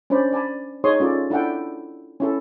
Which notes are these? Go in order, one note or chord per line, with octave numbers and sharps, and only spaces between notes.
C#4 D4 C5 D5 B5
D5 G#5 A5 B5
D#4 G#4 C#5 C6 D#6
C#4 F4 A4 D5
D4 E4 A4 F#5 G5
C#4 E4 A4